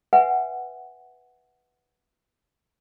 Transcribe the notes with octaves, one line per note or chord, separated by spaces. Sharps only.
B4 E5 F#5 G#5